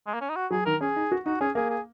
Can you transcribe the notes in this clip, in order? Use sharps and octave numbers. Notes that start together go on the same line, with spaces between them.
G#3
A#3
C#4
D#4
F#4
F#3 G#4
D#3 A#4
C#4 G#4
D#4
F#4
D#4 F#4
C#4 G#4
A#3 G#4
G#4